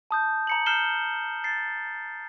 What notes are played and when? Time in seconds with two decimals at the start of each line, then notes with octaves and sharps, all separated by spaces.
0.11 A5 D#6 G6
0.47 A#5 C#7 F#7
0.66 F6 G6 C7 E7 G7
1.44 A6 C7